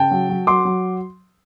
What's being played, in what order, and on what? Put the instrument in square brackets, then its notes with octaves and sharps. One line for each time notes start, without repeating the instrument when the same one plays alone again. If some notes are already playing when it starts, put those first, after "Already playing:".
Already playing: [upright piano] C#3 G5 A5
F#3
F#3
F#3 C6 D6
F#3